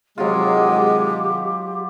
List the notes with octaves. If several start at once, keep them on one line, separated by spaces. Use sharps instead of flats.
C3 D#3 F#3 G#3 F4 G4